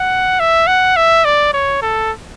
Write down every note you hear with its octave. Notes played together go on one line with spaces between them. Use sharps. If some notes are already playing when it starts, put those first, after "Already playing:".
Already playing: F#5
E5
F#5
E5
D5
C#5
A4